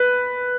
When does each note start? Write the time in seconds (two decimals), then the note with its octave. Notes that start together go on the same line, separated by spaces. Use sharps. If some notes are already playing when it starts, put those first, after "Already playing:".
Already playing: B4